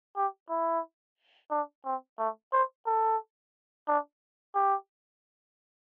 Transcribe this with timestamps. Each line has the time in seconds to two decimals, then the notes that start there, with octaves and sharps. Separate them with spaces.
0.17 G4
0.49 E4
1.51 D4
1.85 C4
2.18 A3
2.52 C5
2.86 A4
3.88 D4
4.55 G4